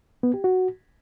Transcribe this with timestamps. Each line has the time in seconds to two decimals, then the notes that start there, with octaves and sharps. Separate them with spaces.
0.23 B3
0.34 G4
0.44 F#4